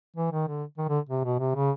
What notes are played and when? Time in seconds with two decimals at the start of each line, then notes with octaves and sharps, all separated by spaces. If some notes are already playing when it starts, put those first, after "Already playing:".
0.16 E3
0.32 D#3
0.48 D3
0.78 D#3
0.88 D3
1.09 C3
1.24 B2
1.39 C3
1.55 C#3